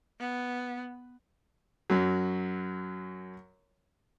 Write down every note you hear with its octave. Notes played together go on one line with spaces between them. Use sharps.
B3
F#2 F#3